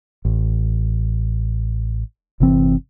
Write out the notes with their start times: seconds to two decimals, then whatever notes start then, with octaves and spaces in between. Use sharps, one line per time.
0.25 A1
2.40 G1 C3 E3 C4